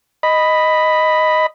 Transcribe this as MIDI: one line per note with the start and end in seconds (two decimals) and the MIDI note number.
0.23 1.46 75
0.23 1.46 83